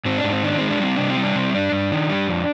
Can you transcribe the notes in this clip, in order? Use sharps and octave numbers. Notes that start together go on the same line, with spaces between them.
G#2 C4
D4
G#2
C4
D#3 D4
G#3 C4
D4
G3 C4
C3 D4
C4
G3
D4
C3 C4
G2 D4
G2
D#3
G3
F2